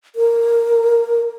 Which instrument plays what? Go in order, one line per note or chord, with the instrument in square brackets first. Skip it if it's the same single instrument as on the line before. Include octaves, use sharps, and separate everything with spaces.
[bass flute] A#4